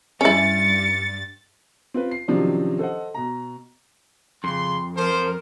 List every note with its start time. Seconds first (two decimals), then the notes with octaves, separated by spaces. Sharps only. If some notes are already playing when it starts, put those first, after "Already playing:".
0.21 G2 C#4 E4 A6 C#7
1.94 C4 F4 B4
2.11 C7
2.28 C3 D#3 F3 F#3 C#4 D4
2.79 A4 C5 D#5 F#5
3.14 B2 A#5
4.44 F2 C#3 C6
4.97 F3 A#4 C5